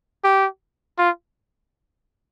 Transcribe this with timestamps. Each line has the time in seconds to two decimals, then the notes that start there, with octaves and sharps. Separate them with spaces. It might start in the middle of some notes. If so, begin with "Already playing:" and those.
0.24 G4
0.98 F4